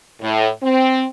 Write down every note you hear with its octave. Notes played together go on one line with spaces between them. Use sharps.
A2
C4